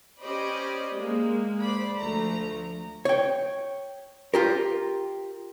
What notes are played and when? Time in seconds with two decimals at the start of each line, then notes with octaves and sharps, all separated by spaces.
0.22 C#4 G4 C5 D5 D#5 B5
0.94 G#3 A#3
1.61 C5 D5 B5
1.99 D2 F3 A3 A#5
3.05 C#5 G5
4.34 F4 G4 A#4